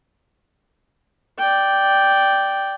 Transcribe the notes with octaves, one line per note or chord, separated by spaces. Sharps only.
D5 G5